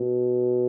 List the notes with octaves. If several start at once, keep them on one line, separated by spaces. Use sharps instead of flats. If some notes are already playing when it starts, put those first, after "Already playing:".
Already playing: B2